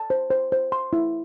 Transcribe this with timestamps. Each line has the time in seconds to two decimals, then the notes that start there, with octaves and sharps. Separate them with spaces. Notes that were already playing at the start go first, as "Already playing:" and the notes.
Already playing: A5
0.10 C5
0.31 C5
0.52 C5
0.72 C6
0.93 E4